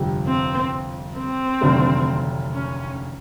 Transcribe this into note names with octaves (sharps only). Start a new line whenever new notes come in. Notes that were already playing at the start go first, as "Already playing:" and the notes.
Already playing: G1 F2 C3
C4
C4
F1 D#2 D3 F#3 A3
C#4